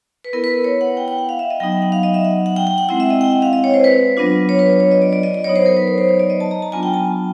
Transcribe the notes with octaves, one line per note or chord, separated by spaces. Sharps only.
B4
B3 E4 A#4
B4
B4
C#5
F#5
G5
G5
F#5
F5
E5
D#5
F#3 B3 D#4 G5
G5
F#5
F5
D#5
E5
F#5
F#5
G5
G5
F#5
G#3 C4 E4 F#5
E5
D#5
G5
F#5
F5
D#5
C#5
C5
B4
F#3 B3 D4 F4
C#5
B4
C#5
C#5
D#5
D5
D5
D#5
D5
F#3 B3 D#4 C#5
C5
A#4
B4
C#5
C5
C#5
D5
D#5
A5
A#5
A5
F#3 B3 D4 F4 G#5
G5
A5